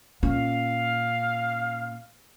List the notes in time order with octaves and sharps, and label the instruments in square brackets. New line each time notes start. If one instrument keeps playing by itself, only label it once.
[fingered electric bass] A#2 [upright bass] C#4 [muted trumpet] F5